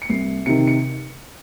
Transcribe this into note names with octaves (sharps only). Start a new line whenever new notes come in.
C#7
C2 C7
C3 D#3 C#7
C#7